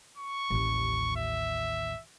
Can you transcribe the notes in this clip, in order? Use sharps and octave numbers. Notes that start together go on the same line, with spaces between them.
C#6
A1 D#2
E5